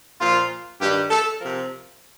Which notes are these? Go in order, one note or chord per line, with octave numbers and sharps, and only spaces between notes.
A#2 F3 F4
G2 D#3 G3 G4
A4
C3 F3 A#4